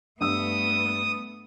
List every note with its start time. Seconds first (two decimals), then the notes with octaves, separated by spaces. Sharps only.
0.21 G2 A3 B3 D#6 E6